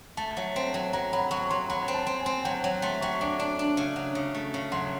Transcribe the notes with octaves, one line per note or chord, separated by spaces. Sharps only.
A3 A5
F#3
C4
F#3
F#3 A#5
F#3 B5
F#3 C#6
F#3 C6
F#3 B5
C4
A5
C4
G#5
C4
F#3 G5
F#5
F#3 G5
A3 C6
F#3 C#6
D4 C#6
D4
D4
C#3
F#3
C#3
A3
C#3
F#3 C6